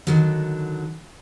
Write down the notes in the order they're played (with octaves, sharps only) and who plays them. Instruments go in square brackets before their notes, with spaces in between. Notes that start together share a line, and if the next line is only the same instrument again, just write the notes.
[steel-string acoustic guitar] D3 D#3 F#3